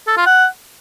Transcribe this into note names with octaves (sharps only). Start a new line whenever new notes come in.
A4
F4
F#5